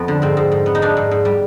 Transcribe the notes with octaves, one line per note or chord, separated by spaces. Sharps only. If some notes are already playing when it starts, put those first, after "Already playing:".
Already playing: F2 B3
D3
G#2 C4
G#2
G#2
B3
D#4
B3 D4
G#2
G#2
G3